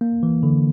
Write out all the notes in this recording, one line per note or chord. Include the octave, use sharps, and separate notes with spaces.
A#3
E3
D3